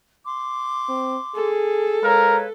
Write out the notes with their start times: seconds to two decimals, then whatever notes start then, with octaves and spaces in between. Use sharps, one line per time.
0.24 C6 D6
0.89 C4
1.35 G#4 A4
2.03 G#3 A#4 B4 C#5 F5